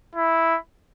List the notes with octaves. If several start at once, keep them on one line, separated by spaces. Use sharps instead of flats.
E4